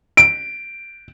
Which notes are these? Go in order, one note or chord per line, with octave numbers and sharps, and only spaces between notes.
D7